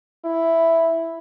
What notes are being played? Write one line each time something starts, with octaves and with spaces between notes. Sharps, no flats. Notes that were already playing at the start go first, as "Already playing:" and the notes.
E4